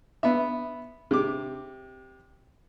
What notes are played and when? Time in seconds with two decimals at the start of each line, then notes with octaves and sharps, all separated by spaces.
0.23 B3 E5
1.11 C3 D6